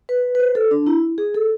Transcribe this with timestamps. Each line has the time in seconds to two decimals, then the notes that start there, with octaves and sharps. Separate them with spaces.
0.09 B4
0.35 B4
0.40 C5
0.55 A4
0.71 D4
0.87 E4
1.18 G#4
1.34 A4